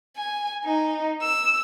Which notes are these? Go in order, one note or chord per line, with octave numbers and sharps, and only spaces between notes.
G#5
D#4
E6